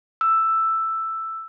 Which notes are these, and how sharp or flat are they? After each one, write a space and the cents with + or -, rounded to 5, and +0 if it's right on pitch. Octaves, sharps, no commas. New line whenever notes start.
E6 +5